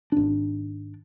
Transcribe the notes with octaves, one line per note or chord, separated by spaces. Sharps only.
G#1 D4